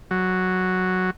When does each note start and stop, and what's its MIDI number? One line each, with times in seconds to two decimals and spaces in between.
0.11 1.10 54